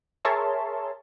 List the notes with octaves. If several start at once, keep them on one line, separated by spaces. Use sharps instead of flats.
G#4 A#4 C#5 E5 A5 C6